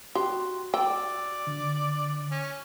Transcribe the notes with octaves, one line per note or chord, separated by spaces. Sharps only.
F#4 G4 C6
D5 G5 E6
D3
C#4